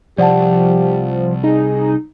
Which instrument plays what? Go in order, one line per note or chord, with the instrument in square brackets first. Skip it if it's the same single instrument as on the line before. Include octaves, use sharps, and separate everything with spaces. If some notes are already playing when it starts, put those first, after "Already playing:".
[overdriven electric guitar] C2 [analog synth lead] F3 [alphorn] G4 [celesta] D5 F#5 A5
[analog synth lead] D#4 [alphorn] G#4